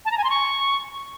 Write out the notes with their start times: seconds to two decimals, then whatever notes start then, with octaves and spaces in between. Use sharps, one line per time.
0.05 A5
0.11 A#5
0.18 G#5
0.24 C6
0.30 C#6